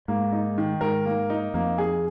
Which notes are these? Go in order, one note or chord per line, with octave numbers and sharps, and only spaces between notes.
G#2 A#3
D#4
D#3
G#2 A#4
A#3
D#4
F2 A#3
G#4